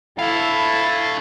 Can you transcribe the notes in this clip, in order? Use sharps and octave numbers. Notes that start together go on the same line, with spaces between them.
D4 E4 A4 F5